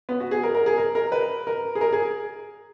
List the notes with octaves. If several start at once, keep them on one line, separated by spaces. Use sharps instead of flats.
B3
F#4
G#4
A#4
A#4
G#4
A#4
A#4
B4
A#4
G#4
A#4
G#4